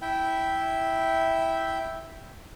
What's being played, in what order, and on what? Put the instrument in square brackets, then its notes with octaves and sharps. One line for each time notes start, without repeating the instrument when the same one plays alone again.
[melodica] E4 E5 G5